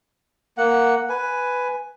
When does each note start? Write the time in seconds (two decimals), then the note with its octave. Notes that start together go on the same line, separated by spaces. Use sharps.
0.58 A#3 F#5
1.09 B4 G#5